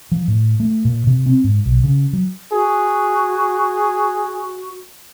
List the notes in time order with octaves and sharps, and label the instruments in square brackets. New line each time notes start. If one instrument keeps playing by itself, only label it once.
[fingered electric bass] F3
A2
A3
A#2
C3
C4
G#2
B1
C#3
F#3
[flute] F#4 [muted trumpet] G#4